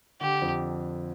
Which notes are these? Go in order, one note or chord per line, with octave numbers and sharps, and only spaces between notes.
D3 G4
F2